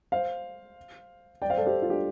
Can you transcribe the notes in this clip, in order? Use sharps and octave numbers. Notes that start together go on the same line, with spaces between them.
C5 F5
D5 G5
C5 F5
A4 D5
G4 C5
F4
D4 G4